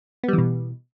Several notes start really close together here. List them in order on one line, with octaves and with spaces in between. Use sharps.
B3 G3 E3 B2